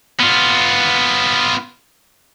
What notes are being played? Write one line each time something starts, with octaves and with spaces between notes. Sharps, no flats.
B3 F4